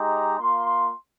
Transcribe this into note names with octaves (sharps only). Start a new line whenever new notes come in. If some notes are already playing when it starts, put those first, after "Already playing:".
Already playing: G#3 D#4 G4 A#5
A#3 F4 C6